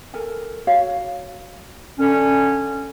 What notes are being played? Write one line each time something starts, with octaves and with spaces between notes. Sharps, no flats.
A4 A#4 G#5
F#4 C#5 F5
D3 C#4